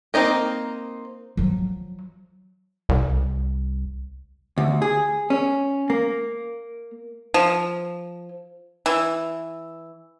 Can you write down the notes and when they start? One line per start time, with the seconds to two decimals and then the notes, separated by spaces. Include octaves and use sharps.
0.14 A#3 C4 D#4 A#4
1.37 F3 F#3
2.89 C2
4.58 D2
4.82 G#4
5.30 C#4
5.90 A#3
7.34 F3
8.86 E3